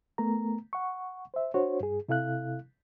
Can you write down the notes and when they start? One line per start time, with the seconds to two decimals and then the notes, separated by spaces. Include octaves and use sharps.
0.18 A3 B3 A#4 A#5
0.73 F#5 C#6
1.34 C5 E5
1.54 D4 F#4 C5 C#5
1.81 G2 G#4
2.09 C3 E4 A4 F5 F#6